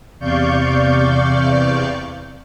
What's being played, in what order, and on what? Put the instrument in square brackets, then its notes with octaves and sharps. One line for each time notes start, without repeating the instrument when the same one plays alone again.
[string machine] E2 C3 D5 F5 C#6 G6